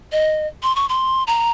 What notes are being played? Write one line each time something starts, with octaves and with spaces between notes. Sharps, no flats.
D#5
C6
C#6
C6
A#5